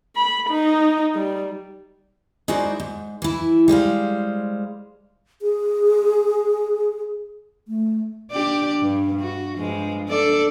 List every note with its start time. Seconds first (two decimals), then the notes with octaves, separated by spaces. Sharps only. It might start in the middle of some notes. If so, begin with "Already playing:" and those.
0.15 B5
0.49 D#4
1.15 G3
2.48 G#3 D#4 E4 F#4 C5 D5
2.80 G#2
3.22 E3 E4
3.68 G3 G#3 C5 F5
5.42 G#4
7.68 A3
8.31 D4 G4 D5
8.80 G2
9.21 F#4
9.57 G2 F3 G#3
10.09 D4 A4 D5